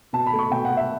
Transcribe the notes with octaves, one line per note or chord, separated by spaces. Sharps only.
B2 A5
B5
A3
C#6
B2 G5
F#5
A3
E5